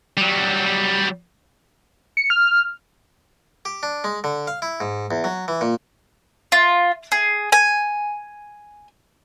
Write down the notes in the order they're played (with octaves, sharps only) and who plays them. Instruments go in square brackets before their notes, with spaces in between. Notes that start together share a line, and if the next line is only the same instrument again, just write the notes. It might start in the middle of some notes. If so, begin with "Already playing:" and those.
[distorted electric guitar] F#3 G3
[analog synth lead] C#7
F6
[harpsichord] G4
D4
G#3
D3
F5
E4
G#2
E2
F#3
E3
A#2
[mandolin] F4
G#4
G#5